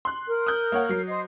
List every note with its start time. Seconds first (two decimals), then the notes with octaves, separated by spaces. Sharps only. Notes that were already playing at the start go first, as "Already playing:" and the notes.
0.05 C6 F#6
0.27 A#4
0.47 D#6 F#6 G6
0.72 A#3 C#5 F#5
0.89 F#3 C7
1.09 C5 D#5 D#6